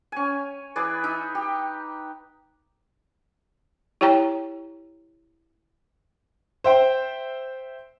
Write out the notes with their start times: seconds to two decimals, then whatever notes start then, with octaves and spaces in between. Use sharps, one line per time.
0.12 C#4 G#5
0.76 E3 G#4 B4 D5
1.04 D#4 E5
1.35 G4
4.01 E4 G4 C#5 G5 A#5
6.64 C5 E5 G5 C6